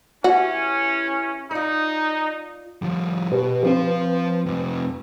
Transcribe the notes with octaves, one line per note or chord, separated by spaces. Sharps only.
E3 C#4 E4 F#4 G4
D#4 F4 D5
F3 G3
B2 G4 B4
F3 C4 B4 F5
F2 C3